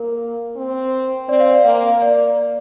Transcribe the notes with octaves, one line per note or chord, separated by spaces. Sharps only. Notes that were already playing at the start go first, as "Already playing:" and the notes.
Already playing: A#3 A#4
C4
C4 D5
F5
D5
A#3 F5
A#3 D5